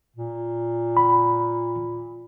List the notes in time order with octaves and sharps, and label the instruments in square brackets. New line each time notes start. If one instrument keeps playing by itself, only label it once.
[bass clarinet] A#2
[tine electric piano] B5